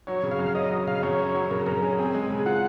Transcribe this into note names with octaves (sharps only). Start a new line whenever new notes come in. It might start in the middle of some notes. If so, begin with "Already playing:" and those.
F#3 C#5
C#3
F5
F#2
C#4 D#5
F#3
C#3 F5
F#2 C#5
C#4
F#3
C#3 A#4
F#2 A#4
C#4 G#4
C4 G#4
G#3
C#3
F4 F#5